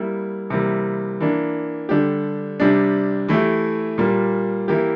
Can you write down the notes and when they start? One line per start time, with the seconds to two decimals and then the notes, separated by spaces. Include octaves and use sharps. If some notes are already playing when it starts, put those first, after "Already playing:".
Already playing: G3 A#3 E4
0.50 C3 E3 G3 A#3
1.20 E3 A#3 D4
1.89 D3 G3 D4 G4
2.60 C3 G3 D4
3.28 E3 A3 E4 G4
3.98 A#2 G3 A#3
4.68 E3 A#3 E4 G4